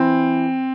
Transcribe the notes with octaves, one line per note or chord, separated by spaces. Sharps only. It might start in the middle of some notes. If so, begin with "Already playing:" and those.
Already playing: E3 C4